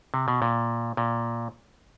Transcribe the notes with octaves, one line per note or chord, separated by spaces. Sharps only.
C3
B2
A#2
A#2